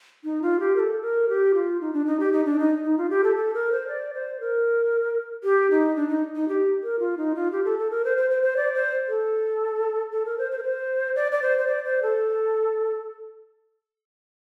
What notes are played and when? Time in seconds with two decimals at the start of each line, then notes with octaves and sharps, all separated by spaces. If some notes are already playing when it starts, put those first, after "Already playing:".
0.24 D#4
0.42 F4
0.60 G4
0.76 A#4
0.80 A4
1.02 A#4
1.29 G4
1.54 F4
1.81 D#4
1.93 D4
2.06 D#4
2.20 G4
2.33 D#4
2.45 D4
2.59 D#4
2.84 D#4
2.98 F4
3.10 G4
3.24 A4
3.36 A4
3.54 A#4
3.72 C5
3.88 D5
4.14 C5
4.40 A#4
5.44 G4
5.71 D#4
5.96 D4
6.09 D#4
6.35 D#4
6.48 G4
6.83 A#4
7.00 F4
7.17 D#4
7.35 F4
7.52 G4
7.65 A4
7.79 A4
7.91 A#4
8.05 C5
8.17 C5
8.30 C5
8.42 C5
8.57 D5
8.74 C5
9.09 A4
10.12 A4
10.26 A#4
10.38 C5
10.52 C5
10.58 A#4
10.63 C5
11.16 D5
11.32 D5
11.42 C5
11.58 C5
11.67 D5
11.85 C5
12.03 A4